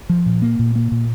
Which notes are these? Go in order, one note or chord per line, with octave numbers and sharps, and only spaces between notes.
F3
A#2
A#3
A#2
A#3
A#2